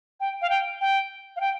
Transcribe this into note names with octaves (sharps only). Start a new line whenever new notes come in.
G5
F5
G5
G5
F5
G5